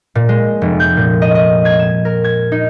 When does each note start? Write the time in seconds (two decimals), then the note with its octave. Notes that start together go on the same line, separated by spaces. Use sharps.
0.15 A#2
0.29 G#3
0.62 F1
0.80 G6
0.97 A#2
1.22 D#5
1.35 D#5
1.65 G#6
1.79 E7
2.05 A#4
2.24 G#6
2.52 D#4